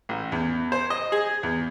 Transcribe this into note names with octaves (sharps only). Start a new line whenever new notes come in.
A1
E2
C5
D#5
G#4
E2